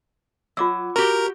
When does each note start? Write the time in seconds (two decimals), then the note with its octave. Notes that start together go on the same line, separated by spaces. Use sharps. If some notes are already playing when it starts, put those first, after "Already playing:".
0.57 F#3 F4 D6 E6
0.96 F#4 G4 A#4